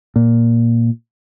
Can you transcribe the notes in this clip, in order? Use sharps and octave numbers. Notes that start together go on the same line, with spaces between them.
A#2